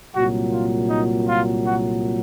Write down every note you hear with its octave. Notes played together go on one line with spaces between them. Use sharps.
C2 A#2 F#3 F#4
F4
D#4
F4
F#4